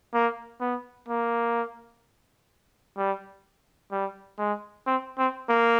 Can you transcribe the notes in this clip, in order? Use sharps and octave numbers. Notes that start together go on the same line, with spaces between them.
A#3
B3
A#3
G3
G3
G#3
C4
C4
A#3